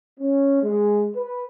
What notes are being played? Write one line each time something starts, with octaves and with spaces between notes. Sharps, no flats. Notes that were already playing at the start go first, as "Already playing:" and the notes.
C#4
G#3
B4